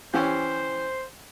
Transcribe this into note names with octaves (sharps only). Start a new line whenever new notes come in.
E3 C#4 G4 C5